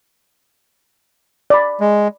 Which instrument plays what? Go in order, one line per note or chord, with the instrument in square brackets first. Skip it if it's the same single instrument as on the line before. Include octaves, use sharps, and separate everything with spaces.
[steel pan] D5 B5
[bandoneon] G#3